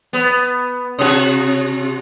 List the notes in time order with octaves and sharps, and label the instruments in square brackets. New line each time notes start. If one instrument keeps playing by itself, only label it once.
[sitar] B3
C3 F#4